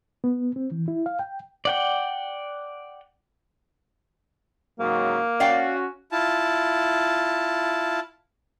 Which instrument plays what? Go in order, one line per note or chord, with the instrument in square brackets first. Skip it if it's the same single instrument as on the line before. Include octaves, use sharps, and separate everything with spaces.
[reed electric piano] B3
C4
E3
E4
F5
G5
[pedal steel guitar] D5 F#5 G5
[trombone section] G#2 C#3 F#3 [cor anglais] A#3
[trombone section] C#4 F#4 [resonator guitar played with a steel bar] D5 F5 G5
[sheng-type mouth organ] E4 F4 A5